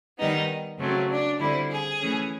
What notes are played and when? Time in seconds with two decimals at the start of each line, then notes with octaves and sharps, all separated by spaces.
0.18 D#3 G3 B3 D#4
0.79 C#3 F#3 A3 C4
1.09 D4
1.39 D3 G3 C4 E4
1.69 G#4
1.99 E3 A3 C#4